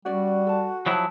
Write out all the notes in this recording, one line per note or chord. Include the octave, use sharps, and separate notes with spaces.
G3 C#4 F#4 D5
A4 A5
F3 F#3 E4 C5 G#5 A5